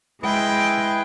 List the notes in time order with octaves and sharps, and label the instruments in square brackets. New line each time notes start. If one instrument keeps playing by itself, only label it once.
[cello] G#3 G5 [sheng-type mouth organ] E4 G#4 B4